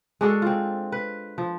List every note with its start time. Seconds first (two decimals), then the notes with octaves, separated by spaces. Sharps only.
0.21 G#3 D4 F#4 A4
0.42 C4 F4
0.92 B4
1.38 F3